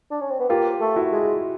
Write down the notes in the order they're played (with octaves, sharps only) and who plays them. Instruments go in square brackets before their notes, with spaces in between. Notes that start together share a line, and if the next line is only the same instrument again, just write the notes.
[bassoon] D4
C#4
C4
B3
[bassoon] A#3 [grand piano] F4 G4
[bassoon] A3
[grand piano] E4 F#4
[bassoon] G#3